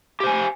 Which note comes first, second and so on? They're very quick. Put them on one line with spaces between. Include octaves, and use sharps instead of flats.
G4 C5 G#5